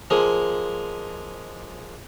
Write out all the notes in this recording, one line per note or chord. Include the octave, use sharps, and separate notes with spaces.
F3 G#3 A#3 G#4